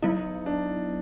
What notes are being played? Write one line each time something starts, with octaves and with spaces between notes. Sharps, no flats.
F#3 B3 D#4 E4
D4